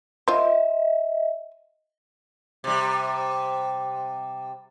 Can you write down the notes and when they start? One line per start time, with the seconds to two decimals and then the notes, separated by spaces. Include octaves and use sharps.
0.28 F4 C5 D#5 E5
2.64 C3 G3